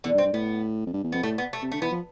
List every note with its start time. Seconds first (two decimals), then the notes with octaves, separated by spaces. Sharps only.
0.04 E2 D3
0.14 G2
0.18 C4
0.24 G2
0.33 A2 B3
0.86 F2
0.93 G2
1.03 E2
1.12 F2 B3
1.23 A2 A3
1.38 B3
1.53 A3
1.62 C3
1.72 D3 A3
1.82 E3 B3
1.91 F3